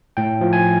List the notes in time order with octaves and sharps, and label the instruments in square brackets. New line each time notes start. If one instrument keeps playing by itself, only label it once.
[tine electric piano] A2 G5
F3
G#5